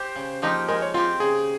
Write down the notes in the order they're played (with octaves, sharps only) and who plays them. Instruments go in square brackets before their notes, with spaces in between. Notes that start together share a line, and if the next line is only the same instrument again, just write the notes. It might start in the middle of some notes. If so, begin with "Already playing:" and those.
Already playing: [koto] G4 [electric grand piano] C5
[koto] C#3
F3 A#3 D#4 G4
[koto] G#3 [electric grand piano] A#4
[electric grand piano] C#5
[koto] C4 G4 [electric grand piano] F4
[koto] C#3 [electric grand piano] G#4